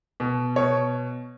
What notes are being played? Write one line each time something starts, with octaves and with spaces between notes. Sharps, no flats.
B2
B2 C#5